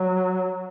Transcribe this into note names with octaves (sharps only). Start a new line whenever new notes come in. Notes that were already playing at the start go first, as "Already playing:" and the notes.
Already playing: F#3